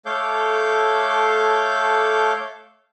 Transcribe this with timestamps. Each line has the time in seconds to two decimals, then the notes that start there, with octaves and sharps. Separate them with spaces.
0.06 A3 A4 C#5 F5 D6 G6